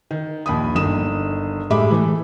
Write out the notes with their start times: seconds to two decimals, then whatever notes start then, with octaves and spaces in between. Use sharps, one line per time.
0.11 D#3
0.46 A#1 D#2 B5 D#6
0.75 G1 D#3 D#6 E7
1.70 A2 G3 G#3 E5 B5 D6
1.91 E3 A3